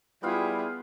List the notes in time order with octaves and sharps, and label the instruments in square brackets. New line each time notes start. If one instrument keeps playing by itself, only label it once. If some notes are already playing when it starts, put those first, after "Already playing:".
[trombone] G3 [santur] B3 F4 F5 [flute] E4 [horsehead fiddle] G#4 G5